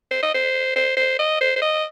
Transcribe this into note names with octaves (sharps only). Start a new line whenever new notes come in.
C5
D#5
C5
C5
C5
D#5
C5
C5
D#5